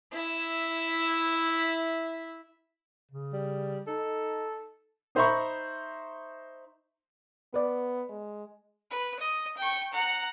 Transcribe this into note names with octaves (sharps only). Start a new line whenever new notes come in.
E4 E5
C#3
G3
D#4 A4
D#4 C5 E5 A#5 B5 C#6
B3 B4 D5
G#3
B4
D#5
G5 C#6
F#5 A#5